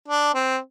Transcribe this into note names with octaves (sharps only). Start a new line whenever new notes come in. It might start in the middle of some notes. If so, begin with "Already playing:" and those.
D4
C4